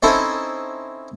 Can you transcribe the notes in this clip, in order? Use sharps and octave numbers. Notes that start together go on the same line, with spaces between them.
C4 C#4 D#4 E4 A4 C5